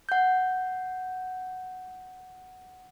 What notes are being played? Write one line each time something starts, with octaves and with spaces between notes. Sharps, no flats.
F#5 G6